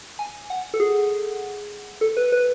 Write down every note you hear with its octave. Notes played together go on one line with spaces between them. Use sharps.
G#5
F#5
A4
G#4
A4
B4
B4